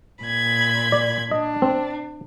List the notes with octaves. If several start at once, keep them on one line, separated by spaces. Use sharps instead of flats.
A#2 B5 G#6
D5
D4 D#5
C4